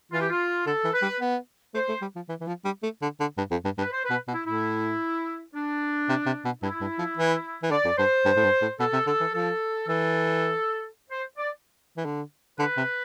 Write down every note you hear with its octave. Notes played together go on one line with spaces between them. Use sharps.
E3 F4
G4
F4
D3 A4
E3
B4
G3
B3
A3 C5
A3
G3
F3
E3
E3
F3
G3
A3
D3
D3
G2
F2
G2
G2
B4
C5
B2 B4
B2
E4
A2 E4
D4
C3
C3
B2
G2 E4
G2
F3
E3
E3
D3 D5
F2
G2 C5
G2
A2
G2
A2
B2 A4
C3
D3 A4
E3
F3 A4
E3 A4
C5
D5
E3
D3
D3 B4
C3